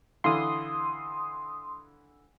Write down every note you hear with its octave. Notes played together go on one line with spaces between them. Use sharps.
D3 E3 F5 C6 D#6